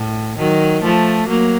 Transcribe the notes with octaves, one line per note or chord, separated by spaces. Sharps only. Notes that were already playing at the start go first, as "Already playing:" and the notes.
Already playing: A2
D#3 F#3
F3 A3
F#3 A#3